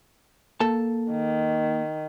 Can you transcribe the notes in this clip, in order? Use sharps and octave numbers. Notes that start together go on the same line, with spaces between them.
A#3 A4 A5
D#3